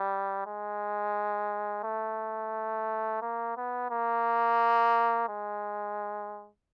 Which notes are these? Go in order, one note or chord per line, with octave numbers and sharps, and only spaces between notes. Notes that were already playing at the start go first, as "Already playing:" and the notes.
Already playing: G3
G#3
A3
A#3
B3
A#3
G#3